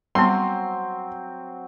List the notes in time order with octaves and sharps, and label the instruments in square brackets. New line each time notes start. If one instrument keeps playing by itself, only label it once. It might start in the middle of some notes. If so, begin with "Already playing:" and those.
[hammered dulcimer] F#3 C4 [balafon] G3 B3 [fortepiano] C6